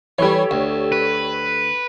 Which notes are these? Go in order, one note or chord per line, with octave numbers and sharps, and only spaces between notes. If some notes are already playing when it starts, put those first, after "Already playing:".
E3 G3 G4 A4 C#5
D2
B4